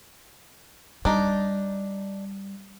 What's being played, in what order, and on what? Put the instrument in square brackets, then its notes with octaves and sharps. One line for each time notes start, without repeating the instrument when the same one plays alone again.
[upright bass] G3 [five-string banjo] D4 D#4